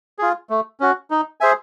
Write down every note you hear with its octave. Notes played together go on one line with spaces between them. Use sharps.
F4 G#4
A3
C#4 F#4
D#4
G#4 C5 E5 G#5